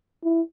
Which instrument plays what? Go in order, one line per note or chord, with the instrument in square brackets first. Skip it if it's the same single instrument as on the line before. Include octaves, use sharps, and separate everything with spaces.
[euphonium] E4